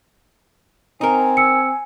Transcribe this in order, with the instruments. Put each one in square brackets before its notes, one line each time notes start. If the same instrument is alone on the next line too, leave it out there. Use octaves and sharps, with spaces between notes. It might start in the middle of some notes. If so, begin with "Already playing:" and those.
[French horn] C4 [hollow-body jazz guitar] D#4 A#4 [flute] G#5
[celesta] E6 C#7